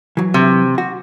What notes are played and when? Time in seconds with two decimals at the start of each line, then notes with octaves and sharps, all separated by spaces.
0.17 E3 F#3
0.34 C3
0.78 F#4